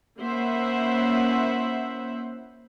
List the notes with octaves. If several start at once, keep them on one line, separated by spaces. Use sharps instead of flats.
A#3 C#4 E4 C5 E5 F#5